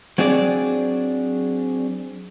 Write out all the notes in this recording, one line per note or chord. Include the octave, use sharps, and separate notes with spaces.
F#3 C4 D4 G#4 D5